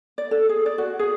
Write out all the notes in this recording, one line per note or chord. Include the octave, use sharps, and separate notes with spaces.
D5
A4
G#4
D5
F#4
G#4